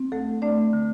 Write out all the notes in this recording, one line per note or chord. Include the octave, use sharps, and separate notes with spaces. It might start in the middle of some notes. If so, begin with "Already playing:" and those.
Already playing: C4
D2 A3 A4
A3 D4 D5
D3